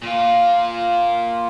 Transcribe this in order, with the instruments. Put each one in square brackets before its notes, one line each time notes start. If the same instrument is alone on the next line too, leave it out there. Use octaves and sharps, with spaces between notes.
[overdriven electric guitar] A#2 F4